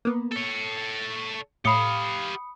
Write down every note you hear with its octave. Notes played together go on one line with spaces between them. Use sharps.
A#3 B3
A4 C#5
A2 G4 F5 B5 D#6 C#7